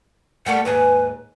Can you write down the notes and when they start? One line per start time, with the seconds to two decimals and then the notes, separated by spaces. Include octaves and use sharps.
0.46 G3 A3 A#3 F#5
0.65 D#2 G#2 G#4 B4